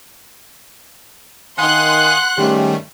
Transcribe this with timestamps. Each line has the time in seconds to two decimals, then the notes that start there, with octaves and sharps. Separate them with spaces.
1.58 D#3 F5 F#5 G#5 C6 D#6 F#6
2.38 G#2 D#3 G3 A3 C#4 G4